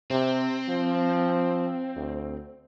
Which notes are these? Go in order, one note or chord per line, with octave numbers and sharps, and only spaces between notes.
C3 C4
F3
D2